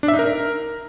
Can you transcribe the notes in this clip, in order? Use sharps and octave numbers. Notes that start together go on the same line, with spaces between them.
D4
E5
D#4
A#4